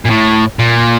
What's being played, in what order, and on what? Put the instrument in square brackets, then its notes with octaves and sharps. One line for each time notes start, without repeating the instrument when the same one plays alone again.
[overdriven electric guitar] A#2
A2
A#2